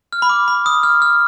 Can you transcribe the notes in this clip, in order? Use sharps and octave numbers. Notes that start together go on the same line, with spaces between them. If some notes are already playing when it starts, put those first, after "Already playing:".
F6
B5
D6
B5
D#6
F6
F6